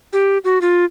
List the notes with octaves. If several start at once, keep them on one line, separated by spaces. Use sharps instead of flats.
G4
F#4
F4